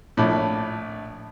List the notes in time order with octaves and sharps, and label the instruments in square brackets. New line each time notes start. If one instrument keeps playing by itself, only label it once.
[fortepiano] A#1 A2